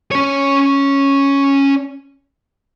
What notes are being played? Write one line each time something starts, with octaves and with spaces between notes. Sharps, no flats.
C#4 C#5